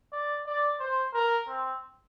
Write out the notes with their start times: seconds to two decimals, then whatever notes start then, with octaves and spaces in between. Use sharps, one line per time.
0.13 D5
0.46 D5
0.80 C5
1.14 A#4
1.48 C4